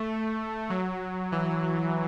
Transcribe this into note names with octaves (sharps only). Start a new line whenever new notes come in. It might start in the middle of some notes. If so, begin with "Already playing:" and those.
Already playing: A3
F#3
E3